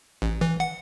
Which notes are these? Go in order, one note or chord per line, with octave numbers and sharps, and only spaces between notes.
A1
E3
F#5